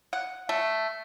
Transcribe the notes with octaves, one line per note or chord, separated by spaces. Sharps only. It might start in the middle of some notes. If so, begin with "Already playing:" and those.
F#5
A3